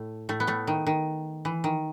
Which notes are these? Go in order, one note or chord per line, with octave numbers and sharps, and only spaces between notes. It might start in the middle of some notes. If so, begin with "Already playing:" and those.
Already playing: A2 A3
A2 A3
B3
A2 A3
D#3
D#3
E3
D#3